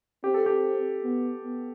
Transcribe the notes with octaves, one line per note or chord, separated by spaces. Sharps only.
C4 G4
A4
G4
B3
B3